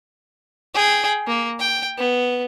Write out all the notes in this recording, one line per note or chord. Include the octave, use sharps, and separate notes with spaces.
G#4 G5
A#3
G5
B3